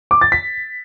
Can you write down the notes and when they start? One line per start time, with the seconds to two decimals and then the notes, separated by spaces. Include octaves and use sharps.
0.11 D6
0.21 A6
0.32 B6